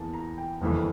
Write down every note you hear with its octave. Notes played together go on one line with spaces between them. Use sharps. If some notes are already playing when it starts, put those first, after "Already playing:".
Already playing: E2 E3 A#3 A5
A#5
G5
G1 F2 E3 A#3